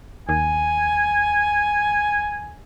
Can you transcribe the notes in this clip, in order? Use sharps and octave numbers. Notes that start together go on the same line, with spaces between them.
D#2 G#5